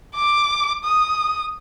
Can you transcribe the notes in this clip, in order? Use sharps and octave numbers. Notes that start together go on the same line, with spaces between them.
D6
D#6